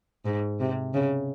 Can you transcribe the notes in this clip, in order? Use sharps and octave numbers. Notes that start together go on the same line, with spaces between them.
G#2
C3
C#3